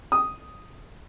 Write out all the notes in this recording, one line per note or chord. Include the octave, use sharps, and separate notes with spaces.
D#6